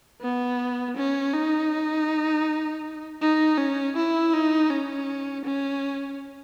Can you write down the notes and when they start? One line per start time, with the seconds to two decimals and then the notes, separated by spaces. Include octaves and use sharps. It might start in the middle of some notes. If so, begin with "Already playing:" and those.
0.21 B3
0.97 C#4
1.34 D#4
3.22 D#4
3.58 C#4
3.96 E4
4.33 D#4
4.70 C#4
5.45 C#4